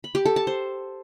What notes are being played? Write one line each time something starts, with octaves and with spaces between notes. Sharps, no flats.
B5
G4
A4
A5
C5